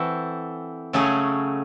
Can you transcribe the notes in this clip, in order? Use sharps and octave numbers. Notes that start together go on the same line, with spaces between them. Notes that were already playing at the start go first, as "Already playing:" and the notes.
Already playing: E3 C4 F#4 A4
C#3 F#3 A3 C#4 G#4